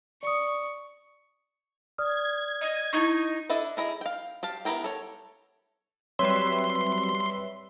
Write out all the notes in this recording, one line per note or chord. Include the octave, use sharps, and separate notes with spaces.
D5 C#6 D#6
D5 D#6 F6 G#6
D#5
D#4 E4 C#6
D4 E4 A4 D#5 E5
D#4 E4 G#4 D#5
F5 G5
G4 F5 A5
B3 E4 G4 A#4 G5
A4 C#5
F#3 G3 C4 B4 C#5 E5 C6